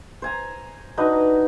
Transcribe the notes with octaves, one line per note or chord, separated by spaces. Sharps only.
C5 G#5 A#5
D4 D#4 F#4 B4